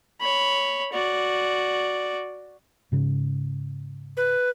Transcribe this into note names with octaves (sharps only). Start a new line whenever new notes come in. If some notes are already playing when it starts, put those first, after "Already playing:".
C#5 B5
F#4 D5
G#2 C#3
B4